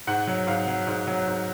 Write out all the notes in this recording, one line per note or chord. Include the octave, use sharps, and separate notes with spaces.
G#2 F#5
F#3
G#2 F5
F#3
G#2
F#3
G#2